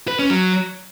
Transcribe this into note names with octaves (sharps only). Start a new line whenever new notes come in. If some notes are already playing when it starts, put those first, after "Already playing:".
B4
C#4
F#3